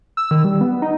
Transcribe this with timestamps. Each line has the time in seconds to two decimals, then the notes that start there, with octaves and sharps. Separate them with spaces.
0.17 E6
0.31 D#3
0.44 G3
0.61 B3
0.82 D#4